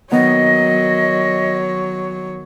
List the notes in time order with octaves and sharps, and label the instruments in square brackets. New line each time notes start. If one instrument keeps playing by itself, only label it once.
[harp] D#3 B3 [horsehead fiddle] F#3 C#5 [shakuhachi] D#5